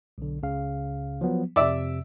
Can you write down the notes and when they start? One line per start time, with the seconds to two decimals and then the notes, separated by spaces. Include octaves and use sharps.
0.18 B1 D3
0.42 C#2 C#3 F5
1.21 F3 F#3 B3
1.56 F2 C3 D5 E5